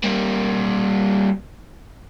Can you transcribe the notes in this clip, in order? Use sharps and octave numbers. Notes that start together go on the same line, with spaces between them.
G3 A#3